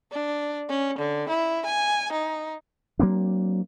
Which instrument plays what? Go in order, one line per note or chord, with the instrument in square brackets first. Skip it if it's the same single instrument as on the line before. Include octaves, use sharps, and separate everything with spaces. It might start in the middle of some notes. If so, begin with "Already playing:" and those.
[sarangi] D4
C#4
D3
E4
G#5
D#4
[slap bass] F#3 A#3 C4 D4